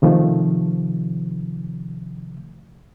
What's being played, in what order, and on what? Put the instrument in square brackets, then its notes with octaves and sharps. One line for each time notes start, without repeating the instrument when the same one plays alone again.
[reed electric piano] C3 D#3 F3 A3